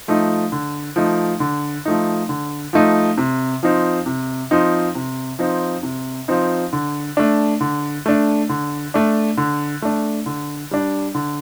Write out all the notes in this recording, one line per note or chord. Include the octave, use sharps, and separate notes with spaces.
F3 A3 D#4
D3
F3 A3 D#4
D3
F3 A3 D#4
D3
F3 A3 D#4
C3
F3 C4 D#4
C3
F3 C4 D#4
C3
F3 C4 D#4
C3
F3 C4 D#4
D3
A3 D4
D3
A3 D4
D3
A3 D4
D3
A3 D4
D3
G3 D4
D3